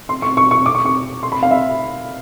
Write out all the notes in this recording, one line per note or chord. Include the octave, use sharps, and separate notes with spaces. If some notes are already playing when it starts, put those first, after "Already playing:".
C6
C#6
C#6
C#6
D6
C#6
C#6
C6
B5
F5
E5